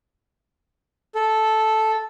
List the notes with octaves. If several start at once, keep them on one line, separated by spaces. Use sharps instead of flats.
A4